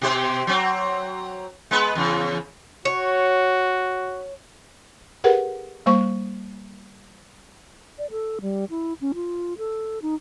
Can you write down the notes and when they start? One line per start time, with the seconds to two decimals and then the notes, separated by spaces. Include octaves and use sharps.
0.02 B2 G4 C5
0.47 F#3 C4
1.71 G#3 B3 B4
1.95 E2 C#3
2.85 F#4 C#5
5.24 G4 G#4 A#4 B4 F#5
5.86 G3 A#3 C5 C#6
7.98 D5
8.11 A4
8.41 G3
8.70 E4
9.01 C#4
9.15 F4
9.58 A4
10.02 D#4